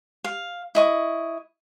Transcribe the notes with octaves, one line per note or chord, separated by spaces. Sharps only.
F5
E4 D#5 C#6